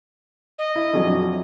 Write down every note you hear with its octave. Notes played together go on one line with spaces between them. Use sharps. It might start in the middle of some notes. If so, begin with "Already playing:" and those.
D#5
E4
A#1 F2 F#3